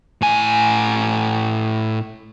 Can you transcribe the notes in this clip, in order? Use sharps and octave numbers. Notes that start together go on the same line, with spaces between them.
A2 G#5